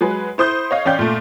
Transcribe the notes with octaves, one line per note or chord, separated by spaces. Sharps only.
F#3 G#3 G#4 B4
E4 C5 D#6 G6
C#5 D#5 F5
A1 C#4 D5 F5 G5 G6
A#2 A3